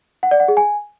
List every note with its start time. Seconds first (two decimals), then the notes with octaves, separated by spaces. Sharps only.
0.23 F#5
0.31 D5
0.40 F#5
0.48 G#4
0.57 G#5